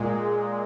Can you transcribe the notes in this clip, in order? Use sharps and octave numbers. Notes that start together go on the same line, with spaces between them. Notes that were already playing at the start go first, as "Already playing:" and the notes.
Already playing: A#2 G#3